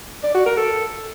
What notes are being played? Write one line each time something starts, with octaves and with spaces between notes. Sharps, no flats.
D5
F#4
A#4
A4